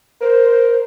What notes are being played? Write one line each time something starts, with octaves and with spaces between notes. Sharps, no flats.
A#4 C5